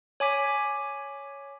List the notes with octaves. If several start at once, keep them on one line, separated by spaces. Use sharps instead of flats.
C#5 G#5 D6 B6